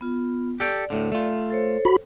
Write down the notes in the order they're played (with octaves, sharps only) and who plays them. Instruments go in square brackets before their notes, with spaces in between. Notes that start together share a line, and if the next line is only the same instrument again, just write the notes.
[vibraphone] B3 F4
[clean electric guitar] G4 A4 G5 [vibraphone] D5
[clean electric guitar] D2 A2 D3
A3 F4
[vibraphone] A4 C5 C#5
[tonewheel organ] F#4 B5